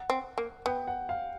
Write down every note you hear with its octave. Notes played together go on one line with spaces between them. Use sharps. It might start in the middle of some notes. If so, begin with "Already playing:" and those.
Already playing: F#5
C4
A#3
B3 G5
F#5
F5